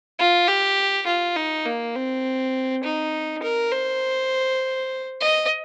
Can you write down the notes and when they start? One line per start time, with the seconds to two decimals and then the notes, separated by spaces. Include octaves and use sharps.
0.19 F4
0.47 G4
1.06 F4
1.36 D#4
1.65 A#3
1.95 C4
2.83 D#4
3.43 A#4
3.72 C5
5.20 D#5